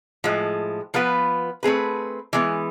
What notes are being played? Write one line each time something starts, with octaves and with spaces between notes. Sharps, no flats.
A2 F3 G#3
F3 B3 F4 B4
A3 C4 G#4 B4
E3 G#3 B3